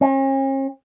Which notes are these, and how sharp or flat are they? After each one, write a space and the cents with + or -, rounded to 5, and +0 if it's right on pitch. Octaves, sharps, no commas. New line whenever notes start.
C#4 -45